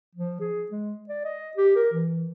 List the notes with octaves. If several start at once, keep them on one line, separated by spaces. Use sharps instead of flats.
F3
G#4
G#3
D5
D#5
G4
A#4
E3